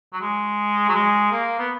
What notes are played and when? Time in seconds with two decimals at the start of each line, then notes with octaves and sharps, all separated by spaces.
0.13 F#3
0.21 G#3
0.89 F#3
0.94 G#3
1.32 A#3
1.59 B3